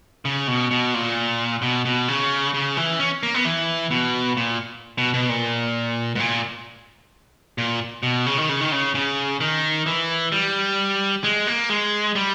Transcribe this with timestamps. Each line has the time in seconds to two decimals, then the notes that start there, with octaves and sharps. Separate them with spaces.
0.25 C#3
0.48 B2
0.71 B2
0.94 A#2
1.62 B2
1.85 B2
2.08 C#3
2.54 C#3
2.77 E3
3.00 C#4
3.23 A#3
3.34 B3
3.45 E3
3.91 B2
4.37 A#2
4.98 B2
5.14 B2
5.29 A#2
6.15 G#2
6.20 A#2
7.58 A#2
8.03 B2
8.26 C#3
8.37 D#3
8.49 C#3
8.61 D#3
8.72 C#3
8.95 C#3
9.41 D#3
9.86 E3
10.32 G3
11.24 G#3
11.47 A#3
11.70 G#3
12.15 G3